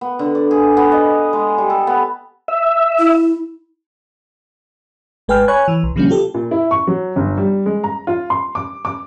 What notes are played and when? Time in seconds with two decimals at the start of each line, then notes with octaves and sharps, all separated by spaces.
0.01 B3
0.19 D3
0.35 D5
0.51 G#4
0.77 B3
0.92 D#5
1.33 G#3
1.58 G3
1.70 A4
1.87 B3
2.48 E5
2.99 E4
5.28 G#1 G#3 B4 G5 G#5 F6
5.48 C#5 G#5 B5 C#6 F#6 G#6
5.68 E3
5.83 B1
5.96 B2 D3 F3 G3 A#3 C#4
6.09 F4 G4 A4
6.34 A#2
6.51 E4
6.71 C#6
6.87 F#3
7.16 G1
7.38 G3
7.66 G#3
7.84 A#5
8.07 F4
8.30 C6
8.55 D6
8.85 D6